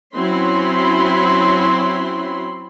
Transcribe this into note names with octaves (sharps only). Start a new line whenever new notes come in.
F#3 C4 C#4 E4 B5 C6